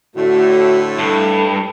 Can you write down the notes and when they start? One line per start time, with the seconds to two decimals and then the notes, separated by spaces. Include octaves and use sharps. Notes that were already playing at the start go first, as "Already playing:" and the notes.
0.15 A2 D3 A3 F#4
0.99 G2 A4